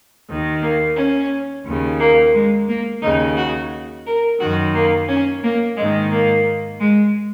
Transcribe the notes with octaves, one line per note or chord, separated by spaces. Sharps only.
D#2 D#3
A#3
C#4
D#2 C#3
A#3
G#3
A#3
D#2 C#3 D#4
F#4
A#4
F#2 D#3 F#4
A#3
C#4
A#3
G#2 D#3 G#3
A#3
G#3